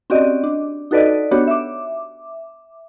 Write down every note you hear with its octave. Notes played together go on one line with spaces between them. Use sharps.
C4 C#4 F#4 G4 D5 D#5
D4
D#4 F#4 A4 B4 D5 D#5
B3 D4 F#4 G4 C#5
E5 D6